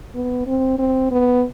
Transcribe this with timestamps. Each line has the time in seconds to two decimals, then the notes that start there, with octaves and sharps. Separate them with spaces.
0.15 B3
0.47 C4
0.79 C4
1.11 B3